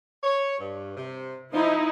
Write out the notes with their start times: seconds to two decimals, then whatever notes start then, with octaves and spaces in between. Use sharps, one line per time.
0.24 C#5
0.59 G2
0.96 C3
1.53 F3 D#4 E4